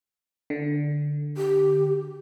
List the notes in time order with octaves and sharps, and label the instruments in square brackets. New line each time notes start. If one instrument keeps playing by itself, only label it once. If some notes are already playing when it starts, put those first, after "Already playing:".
[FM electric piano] D3
[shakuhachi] G4